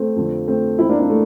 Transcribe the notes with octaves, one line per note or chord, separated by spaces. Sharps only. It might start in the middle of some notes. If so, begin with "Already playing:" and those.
Already playing: A3 C4
F2 D3 F3
A3 C4
F2 E3 C4 E4
A#3 D4
A#3 D4
A3